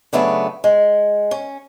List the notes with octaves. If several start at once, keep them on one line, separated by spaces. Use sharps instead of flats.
C#3 F#3 A3 B3 D4
G#3
C#4